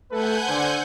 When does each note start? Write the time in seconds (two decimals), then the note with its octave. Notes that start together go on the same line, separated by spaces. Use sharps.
0.11 A3 A4 B4 F#5 G#5 G6
0.47 D3 C5